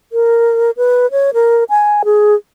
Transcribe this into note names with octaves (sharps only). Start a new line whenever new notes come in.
A#4
B4
C#5
A#4
G#5
G#4